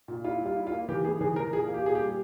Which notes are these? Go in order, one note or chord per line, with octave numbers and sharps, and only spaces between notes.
A#2
E4 F4
G3 F4
E4
F4
A#3
E3 G4
E3 G#4
E3 G#4
E3 A#4
A#2 G#4
A#3
G4
A#2 G#4
G4
G3